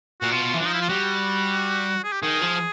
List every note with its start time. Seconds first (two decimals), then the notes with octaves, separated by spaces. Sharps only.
0.21 A#2 F#4
0.32 B2 F4
0.54 E3
0.59 F3 D4
0.66 D#4
0.74 E4
0.82 F4
0.88 G3 F#4
2.04 G#4
2.12 G4
2.22 D#3 G#4
2.41 F3